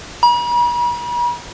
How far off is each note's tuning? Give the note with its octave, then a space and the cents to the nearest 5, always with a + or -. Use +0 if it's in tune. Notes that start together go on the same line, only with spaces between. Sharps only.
B5 -45